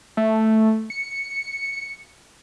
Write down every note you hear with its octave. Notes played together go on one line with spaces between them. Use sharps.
A3
C#7